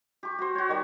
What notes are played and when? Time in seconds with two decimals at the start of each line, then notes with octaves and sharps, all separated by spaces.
0.23 G4 C#6
0.39 F#4 C5
0.55 F#4 C#5
0.69 D#3 G3